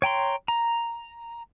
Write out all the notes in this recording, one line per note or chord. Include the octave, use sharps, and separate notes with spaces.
C#5 G5 A#5 C6
A#5